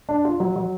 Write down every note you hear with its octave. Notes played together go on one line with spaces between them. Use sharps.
D4
F4
F#3
F#3